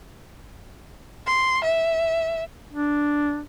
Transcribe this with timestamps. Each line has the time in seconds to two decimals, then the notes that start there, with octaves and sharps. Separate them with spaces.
1.26 C6
1.64 E5
2.73 D4